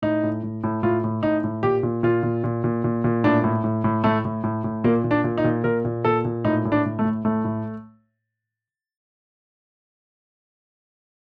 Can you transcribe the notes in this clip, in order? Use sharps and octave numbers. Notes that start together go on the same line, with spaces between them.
A2 D#4
A2
A2
A2
A2 F4
A2
A2 D#4
A2
A#2 G4
A#2
A#2 F4
A#2
A#2
A#2
A#2
A#2
A2 D4
A2
A2
A2
A2 A3
A2
A2
A2
A#2 A#3
A#2
D4
A#2
D#4
A#2
A#2 A#4
A#2
A#2 A4
A#2
A2 D#4
A2
D4
A2
A3
A2
A2 A3
A2